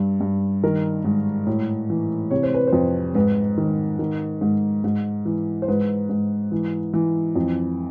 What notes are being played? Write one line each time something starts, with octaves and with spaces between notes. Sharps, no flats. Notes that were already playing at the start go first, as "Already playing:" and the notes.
Already playing: G2
G2
D#3 A#4
G#2
A2
E3
C3 C#5
C5
B4
C5
F2
G#2 B4
D#3
D#3
G#2
G#2
E3
C5
G#2 B4
G#2
E3
E3
F2